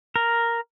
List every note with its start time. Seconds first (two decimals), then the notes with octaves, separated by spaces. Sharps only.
0.16 A#4